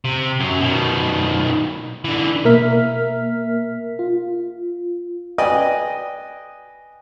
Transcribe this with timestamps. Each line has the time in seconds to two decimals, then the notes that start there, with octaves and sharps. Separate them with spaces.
0.05 C3
0.40 F#2 F#3
0.60 B2 D#3
2.04 D3 E3
2.45 B2 A#3 A#4 E5 F6 B6
3.99 F4
5.38 B4 D5 D#5 G5 G#5 D#6